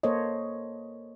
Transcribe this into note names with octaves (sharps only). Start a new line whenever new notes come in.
A#3 A4 C5 C#5 D#5